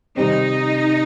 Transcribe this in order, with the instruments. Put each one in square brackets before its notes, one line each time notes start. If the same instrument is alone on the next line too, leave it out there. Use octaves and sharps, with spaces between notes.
[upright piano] C3 D#3 G3 C4 [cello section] D#4